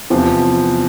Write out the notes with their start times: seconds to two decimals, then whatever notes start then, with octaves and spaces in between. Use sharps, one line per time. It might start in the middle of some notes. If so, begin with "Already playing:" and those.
0.10 E2 C3 F3